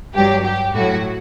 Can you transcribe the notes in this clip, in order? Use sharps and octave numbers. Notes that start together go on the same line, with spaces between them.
G2 F#3 G4
G4
A2 F#3 F#4